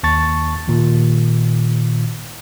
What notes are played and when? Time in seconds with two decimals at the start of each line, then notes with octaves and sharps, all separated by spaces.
0.03 D#2 A5 C#6 A6
0.68 A#2 D#3